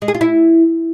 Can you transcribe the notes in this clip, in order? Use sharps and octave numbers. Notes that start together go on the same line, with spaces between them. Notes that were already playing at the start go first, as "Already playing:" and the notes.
G#3
G#4
F4
E4